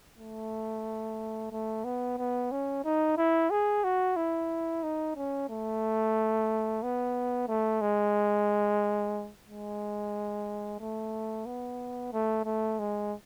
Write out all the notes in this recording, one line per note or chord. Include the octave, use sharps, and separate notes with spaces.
A3
A3
B3
B3
C#4
D#4
E4
G#4
F#4
E4
D#4
C#4
A3
B3
A3
G#3
G#3
A3
B3
A3
A3
G#3